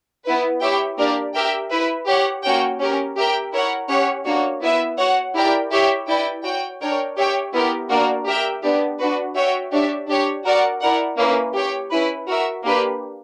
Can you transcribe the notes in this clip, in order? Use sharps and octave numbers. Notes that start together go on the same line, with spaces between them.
B3 E4 B4
E4 G4 C#5 E5 G5
A#3 D4 G4 A#4 D5
G4 A#4 E5 G5
E4 B4 E5
G4 C#5 F#5
A#3 C#4 F#4 C#5 G5
C#4 G4 A#4
G4 A#4 E5 G5
E4 A#4 C#5 F#5
C#4 G4 C#5 F#5
A#3 D4 F#4 C#5
B3 E4 B4 E5
F#4 C#5 F#5
E4 G4 A#4 D5 G5
E4 G4 C#5 E5 G5
E4 B4 D5 G5
F#4 C#5 G5
D4 A#4 C#5 G5
G4 C#5 E5 G5
B3 E4 G4 A#4
A#3 D4 F#4 A#4 D5
G4 A#4 E5 G5
B3 D4 G4
D4 F#4 B4
F#4 C#5 E5 G5
D4 G4 C#5 E5
D4 G4 C#5
F#4 A#4 D5 F#5
E4 A#4 D5 F#5
A#3 C#4 E4 B4
G4 C#5 G5
C#4 E4 B4
F#4 A#4 E5
A#3 D4 G4 B4